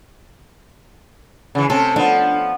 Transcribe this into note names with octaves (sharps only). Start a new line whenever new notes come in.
C#3 E3
C3 C4 C#4 A4
F3 B3 D4